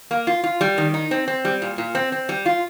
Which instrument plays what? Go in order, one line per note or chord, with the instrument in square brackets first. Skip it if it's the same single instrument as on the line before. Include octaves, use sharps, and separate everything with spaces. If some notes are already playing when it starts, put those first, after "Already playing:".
[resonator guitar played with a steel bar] A#3
F4
F4
G3
D#3
D#4
C4
C4
G3
A#2
A#2
C4
C4
G3
F4